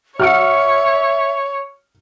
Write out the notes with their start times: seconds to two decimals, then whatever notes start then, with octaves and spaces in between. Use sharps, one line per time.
0.20 F#4 C#5 E5 F#5 F6 C#7